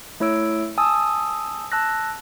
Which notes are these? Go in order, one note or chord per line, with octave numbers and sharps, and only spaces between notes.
A3 E4 C#5 E6 D7
G#5 A5 D#6 E6
A5 E6 F#6 A#6